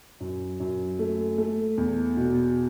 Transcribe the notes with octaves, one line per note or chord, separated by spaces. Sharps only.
F#2
F#2
A3
A3
E2
B2